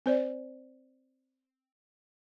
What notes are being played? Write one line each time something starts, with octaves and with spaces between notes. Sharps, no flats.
C4 C5 D5